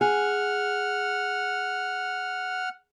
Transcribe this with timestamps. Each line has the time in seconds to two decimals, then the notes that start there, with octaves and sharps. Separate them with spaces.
0.01 G#4 F#5 F6